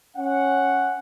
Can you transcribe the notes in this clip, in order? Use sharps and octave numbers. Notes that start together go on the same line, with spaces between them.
C#4 F#5